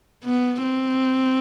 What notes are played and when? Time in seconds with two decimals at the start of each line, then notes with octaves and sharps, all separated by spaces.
0.25 B3
0.63 C4